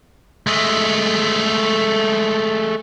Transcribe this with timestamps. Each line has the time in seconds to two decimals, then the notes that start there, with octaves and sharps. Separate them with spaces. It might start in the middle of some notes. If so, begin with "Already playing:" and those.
0.47 G#3 A3